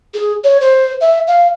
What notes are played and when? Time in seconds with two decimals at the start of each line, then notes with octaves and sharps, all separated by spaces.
0.14 G#4
0.44 C#5
0.61 C5
1.01 E5
1.27 F5